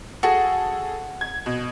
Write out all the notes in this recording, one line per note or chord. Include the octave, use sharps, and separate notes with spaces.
F#4 G#4 A4
G#6
B2